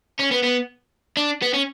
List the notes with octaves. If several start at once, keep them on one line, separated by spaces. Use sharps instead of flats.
C#4
B3
B3
D4
B3
C#4